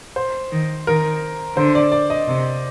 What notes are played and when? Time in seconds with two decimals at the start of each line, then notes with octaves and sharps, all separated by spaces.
0.16 C5
0.52 D#3
0.87 D#3 A#4
1.56 D3 C5
1.75 D5
1.92 D5
2.10 D#5
2.28 C3